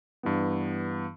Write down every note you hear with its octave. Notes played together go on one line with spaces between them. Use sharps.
G2 E3 B3